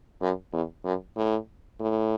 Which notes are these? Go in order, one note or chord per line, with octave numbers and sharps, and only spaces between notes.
F#2
E2
F#2
A2
A2